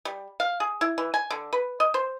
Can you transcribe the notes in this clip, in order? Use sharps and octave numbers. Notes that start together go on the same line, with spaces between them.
G3
F5
G#4
E4
E3
G#5
D3
B4
D#5
C5